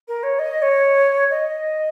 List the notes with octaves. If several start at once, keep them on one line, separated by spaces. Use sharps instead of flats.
A#4
C#5
D#5
C#5
D#5